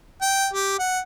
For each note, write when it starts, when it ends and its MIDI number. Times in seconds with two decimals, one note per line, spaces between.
0.22 0.48 79
0.53 0.75 67
0.79 1.00 78